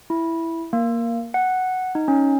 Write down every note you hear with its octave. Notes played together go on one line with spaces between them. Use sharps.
E4
A#3
F#5
D#4
C#4